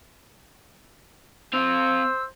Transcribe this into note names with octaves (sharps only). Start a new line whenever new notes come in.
C4 C5 F5 E6